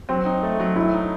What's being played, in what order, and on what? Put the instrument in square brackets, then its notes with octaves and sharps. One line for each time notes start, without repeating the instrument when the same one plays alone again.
[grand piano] F#3 [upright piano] C4
[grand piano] D#4
A3
F#3
[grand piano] F#3 [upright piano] E4
[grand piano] D#4